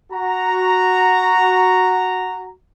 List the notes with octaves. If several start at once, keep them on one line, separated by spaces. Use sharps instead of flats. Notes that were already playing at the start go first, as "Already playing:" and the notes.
F#4 A#5